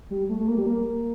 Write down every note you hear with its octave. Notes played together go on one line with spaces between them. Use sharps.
G3
A3
A3
A#3
G3
A#3